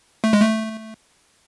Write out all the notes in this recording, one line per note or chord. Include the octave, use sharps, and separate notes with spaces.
A3
G#3
A3